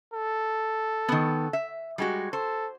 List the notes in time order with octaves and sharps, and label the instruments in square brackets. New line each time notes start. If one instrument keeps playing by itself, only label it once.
[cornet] A4
[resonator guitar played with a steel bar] D#3 B3
E5
G3 G#3 F#4
[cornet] A4 [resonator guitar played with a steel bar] C5